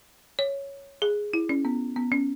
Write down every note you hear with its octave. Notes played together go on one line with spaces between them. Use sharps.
C#5
G#4
E4
C#4
B3
B3
C#4